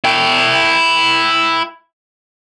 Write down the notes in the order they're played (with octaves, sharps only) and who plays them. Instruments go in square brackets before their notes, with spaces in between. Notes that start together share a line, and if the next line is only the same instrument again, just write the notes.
[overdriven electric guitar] E4 G5